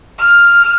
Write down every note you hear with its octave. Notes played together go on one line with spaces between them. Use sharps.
F6